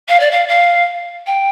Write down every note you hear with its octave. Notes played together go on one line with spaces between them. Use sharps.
F5
D5
F5
F5
G5